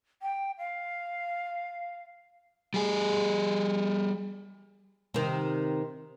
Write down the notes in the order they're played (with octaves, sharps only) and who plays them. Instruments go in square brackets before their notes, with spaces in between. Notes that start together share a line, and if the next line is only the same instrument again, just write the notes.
[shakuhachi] G5
F5
[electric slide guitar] G3 G#4
[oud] C3 D#3